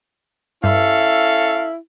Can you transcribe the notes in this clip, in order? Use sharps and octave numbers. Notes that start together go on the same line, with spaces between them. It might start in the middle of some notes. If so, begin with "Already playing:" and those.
G2 C#4 E4 A4 F5